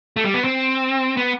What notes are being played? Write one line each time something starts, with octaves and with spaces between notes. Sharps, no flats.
A3
G3
B3
C4
B3